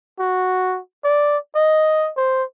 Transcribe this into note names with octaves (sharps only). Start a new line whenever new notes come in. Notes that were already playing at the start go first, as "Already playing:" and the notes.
F#4
D5
D#5
C5